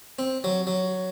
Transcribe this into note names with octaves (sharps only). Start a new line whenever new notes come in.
C4
F#3
F#3